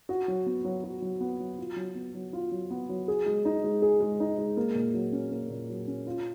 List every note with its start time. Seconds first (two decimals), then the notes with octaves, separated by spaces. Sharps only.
0.09 F#4
0.28 F#3
0.46 B3
0.65 F#3
0.84 F#4
1.02 F#3
1.21 B3
1.40 F#3
1.58 F4
1.76 F#3
1.95 B3
2.15 F#3
2.33 F4
2.52 F#3
2.70 B3
2.89 F#3
3.08 G#4
3.26 G#3
3.45 D#4
3.64 G#3
3.82 G#4
4.01 G#3
4.20 D#4
4.38 G#3
4.57 A#3
4.75 A#2
4.94 F#3
5.12 C#4
5.31 A#3
5.50 A#2
5.69 F#3
5.87 C#4
6.07 F4